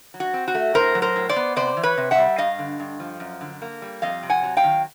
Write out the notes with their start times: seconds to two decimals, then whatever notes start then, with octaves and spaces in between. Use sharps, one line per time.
0.14 F#3
0.20 F#4
0.34 C4
0.48 F#4
0.55 A3
0.74 A2 A#4 C5
0.95 F#3
1.02 A#4 C5
1.16 A2
1.29 C5 D5
1.36 B3
1.56 C3 C5 D5
1.77 E3
1.83 B4 C#5
1.98 C3
2.11 E5 F#5
2.18 G3
2.38 G2 D#5 F5
2.59 D3
2.80 G2
3.00 F3
3.20 F#2
3.41 D3
3.62 A#3
3.82 G3
4.02 F2 D#5 F5
4.23 C3
4.30 F#5 G#5
4.43 F#3
4.57 F5 G5
4.64 D#3